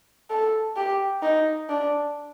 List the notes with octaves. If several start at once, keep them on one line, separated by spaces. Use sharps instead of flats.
A4
G4
D#4
D4